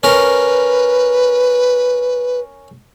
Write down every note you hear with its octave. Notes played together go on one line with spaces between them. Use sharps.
C#4 A#4 B4